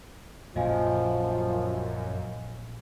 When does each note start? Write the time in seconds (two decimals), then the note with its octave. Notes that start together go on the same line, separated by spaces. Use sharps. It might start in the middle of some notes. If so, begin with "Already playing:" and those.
0.56 A#1 F#2 A#2 F3 D#5 F5 G#5